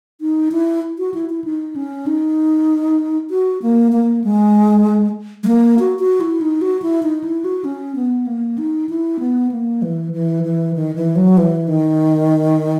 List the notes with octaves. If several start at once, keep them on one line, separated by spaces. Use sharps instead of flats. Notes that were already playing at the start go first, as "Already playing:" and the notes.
D#4
E4
F#4
E4
E4
D#4
C#4
D#4
F#4
A#3
A#3
G#3
G#3
A#3
F#4
F#4
E4
D#4
F#4
E4
D#4
E4
F#4
C#4
B3
A#3
D#4
E4
B3
A#3
E3
E3
E3
D#3
E3
F#3
E3
D#3